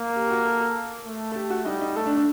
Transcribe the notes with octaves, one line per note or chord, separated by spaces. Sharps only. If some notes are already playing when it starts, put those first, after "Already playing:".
Already playing: A#3
G4
F#4
A4
A4
A3
A4
G4
F#4
G3 D#4
D#4
A3 A4
D4
D4